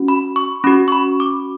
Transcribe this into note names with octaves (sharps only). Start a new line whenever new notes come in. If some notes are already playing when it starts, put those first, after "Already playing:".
Already playing: C#4 F#4
B5
C#6
C#4 F#4 B5
C#6
B5
D6